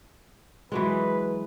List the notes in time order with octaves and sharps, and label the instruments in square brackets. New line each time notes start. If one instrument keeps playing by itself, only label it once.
[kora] E3 F#3 G#3 [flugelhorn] B4